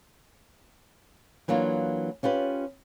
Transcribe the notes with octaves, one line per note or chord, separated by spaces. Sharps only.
E3 F#3 A#3 D4 F4
C#4 F4 G4 B4